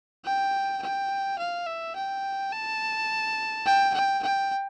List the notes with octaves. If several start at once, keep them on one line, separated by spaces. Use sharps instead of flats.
G5
G5
F5
E5
G5
A5
G5
G5
G5